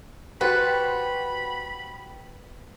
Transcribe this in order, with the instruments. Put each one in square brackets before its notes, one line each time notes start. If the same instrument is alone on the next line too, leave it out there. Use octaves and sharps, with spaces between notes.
[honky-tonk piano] F#4 G4 C5 [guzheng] B4 [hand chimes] G5 A6 C#7 [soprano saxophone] B5